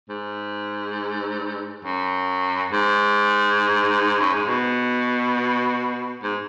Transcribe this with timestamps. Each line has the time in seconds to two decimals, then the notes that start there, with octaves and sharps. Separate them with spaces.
0.09 G#2
1.85 F#2
2.72 G#2
4.20 F#2
4.34 G#2
4.48 B2
6.23 G#2